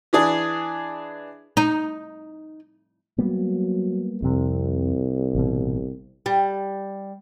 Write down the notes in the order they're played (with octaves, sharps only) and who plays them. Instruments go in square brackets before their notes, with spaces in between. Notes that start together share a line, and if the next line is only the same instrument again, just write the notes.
[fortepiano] E3 D4 G#4
[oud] D#4
[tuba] F#3 [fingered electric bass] G3 A#3 B3
[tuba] C2 [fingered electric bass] F2 C3
[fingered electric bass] A1 B2
[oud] G3